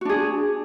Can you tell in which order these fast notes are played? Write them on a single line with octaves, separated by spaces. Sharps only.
F#4 D4 G#4